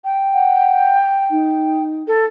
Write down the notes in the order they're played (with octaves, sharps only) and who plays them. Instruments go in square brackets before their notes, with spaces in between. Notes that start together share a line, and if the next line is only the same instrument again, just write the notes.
[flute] G5
[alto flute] F#5
D#4
[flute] A4